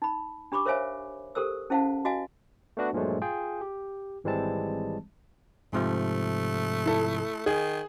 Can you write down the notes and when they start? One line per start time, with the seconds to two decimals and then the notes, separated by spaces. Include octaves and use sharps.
0.02 D#4 B5
0.52 D4 G4 B5 C#6 D6
0.66 A#4 C5 C#5 E5 F5 G#5
1.35 G4 A4 A#4 C5 E6
1.70 C#4 E4 C5 F5 F#5 A5
2.05 F#4 D#5 F5 G#5
2.77 A3 B3 D4 F#4 B4
2.93 G2 A#2 F3 F#3 G#3 A3
3.22 F4 G#4 G5
3.61 G4
4.24 G#1 E3 G3 G#3 C4 A5
5.73 G#2 C3 F3 A3
6.86 E4 A4
7.46 D#3 G#4